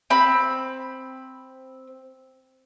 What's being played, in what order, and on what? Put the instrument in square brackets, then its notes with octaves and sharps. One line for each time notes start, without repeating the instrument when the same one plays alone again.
[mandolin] C4 B5